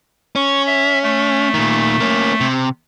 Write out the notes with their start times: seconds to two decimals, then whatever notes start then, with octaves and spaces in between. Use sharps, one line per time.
0.36 C#4 C#6
0.67 E5
1.03 A3
1.54 A#2 D#3
2.00 A#3 C#4
2.41 C3